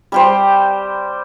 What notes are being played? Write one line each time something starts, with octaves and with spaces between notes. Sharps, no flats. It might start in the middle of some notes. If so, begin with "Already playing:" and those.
G3 G4 C5